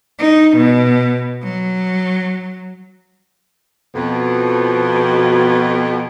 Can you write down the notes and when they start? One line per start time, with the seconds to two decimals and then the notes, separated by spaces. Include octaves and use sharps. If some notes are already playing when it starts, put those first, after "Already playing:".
0.17 D#4
0.56 B2
1.43 F#3
3.94 F2 B2